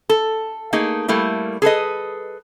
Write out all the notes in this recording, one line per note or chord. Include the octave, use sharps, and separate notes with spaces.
A4
A3 A#3 D#4 G#4
G3 A3 A#3 E4
G#4 A4 B4 D#5